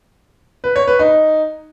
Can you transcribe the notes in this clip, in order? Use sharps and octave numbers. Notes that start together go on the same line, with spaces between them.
B4
C#5
B4
D#4